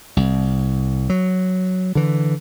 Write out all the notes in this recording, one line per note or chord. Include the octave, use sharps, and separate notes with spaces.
C2
F#3
D3 E3